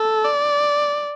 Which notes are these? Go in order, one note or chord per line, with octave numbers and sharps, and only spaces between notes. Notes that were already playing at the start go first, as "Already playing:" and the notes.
Already playing: A4
D5